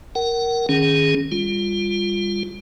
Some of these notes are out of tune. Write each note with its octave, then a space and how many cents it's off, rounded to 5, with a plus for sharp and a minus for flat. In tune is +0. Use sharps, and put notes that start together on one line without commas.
A#4 +0 F#5 +35
D#3 -10 C#4 +5 G#4 +0
G3 +30 F4 +0